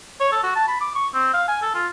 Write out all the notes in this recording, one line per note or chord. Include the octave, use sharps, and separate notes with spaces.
C#5
A4
F#4
A5
B5
D6
C#6
C4
F5
G#5
A4
F4